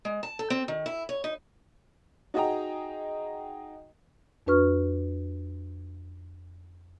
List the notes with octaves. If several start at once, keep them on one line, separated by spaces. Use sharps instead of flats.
G#3
A5
A4
C4
D#3
E4
C#5
D#4
D#4 F#4 G#4 D#5 G5 A#5
F2 D4 F#4 B4 C#6 F6